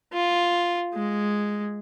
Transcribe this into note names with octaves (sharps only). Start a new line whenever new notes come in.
F4
G#3